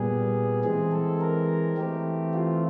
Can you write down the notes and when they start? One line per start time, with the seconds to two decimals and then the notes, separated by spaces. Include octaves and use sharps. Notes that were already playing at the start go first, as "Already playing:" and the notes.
Already playing: A#2 G3 B3 G#4
0.64 E3 G#3 C4 G#4
0.92 A4
1.21 A#4
1.77 E3 A3 C4 G4
2.34 F4